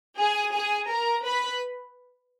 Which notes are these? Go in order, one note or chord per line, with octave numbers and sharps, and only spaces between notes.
G#4 G#5
G#4 G#5
A#4 A#5
B4 B5